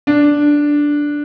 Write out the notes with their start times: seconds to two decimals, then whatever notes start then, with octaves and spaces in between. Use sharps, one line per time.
0.07 D4